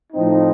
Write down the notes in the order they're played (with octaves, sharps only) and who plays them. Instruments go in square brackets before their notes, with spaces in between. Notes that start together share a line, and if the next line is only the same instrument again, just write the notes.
[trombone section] A2 F3 C4 D#4